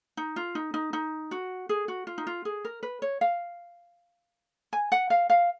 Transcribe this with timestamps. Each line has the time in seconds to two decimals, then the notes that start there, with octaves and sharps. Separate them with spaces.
0.17 D#4
0.36 F4
0.55 D#4
0.74 D#4
0.93 D#4
1.31 F#4
1.69 G#4
1.88 F#4
2.07 F4
2.18 D#4
2.27 F4
2.45 G#4
2.65 A#4
2.83 B4
3.02 C#5
3.21 F5
4.73 G#5
4.92 F#5
5.10 F5
5.30 F5